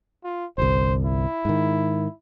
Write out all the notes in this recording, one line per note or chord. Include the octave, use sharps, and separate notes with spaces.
F4
G1 C2 C5
E4
G#2 D#3